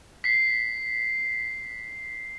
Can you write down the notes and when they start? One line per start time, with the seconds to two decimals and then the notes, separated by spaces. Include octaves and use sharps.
0.24 B6 C7